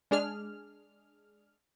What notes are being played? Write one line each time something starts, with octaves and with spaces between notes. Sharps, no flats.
G#3 D4 G#4 F6